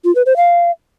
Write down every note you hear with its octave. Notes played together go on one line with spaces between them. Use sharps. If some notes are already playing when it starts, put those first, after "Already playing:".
F4
B4
C5
F5